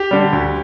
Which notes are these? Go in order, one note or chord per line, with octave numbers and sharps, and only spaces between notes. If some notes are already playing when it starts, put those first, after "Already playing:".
Already playing: G4
D3 G3
D2